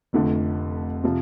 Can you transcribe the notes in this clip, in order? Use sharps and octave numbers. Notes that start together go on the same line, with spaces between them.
F1 F2 D3 A3
C3 F3